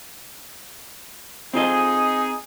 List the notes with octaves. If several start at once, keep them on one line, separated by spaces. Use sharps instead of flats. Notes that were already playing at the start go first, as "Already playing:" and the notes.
C4 D#4 F4 G#4 D#5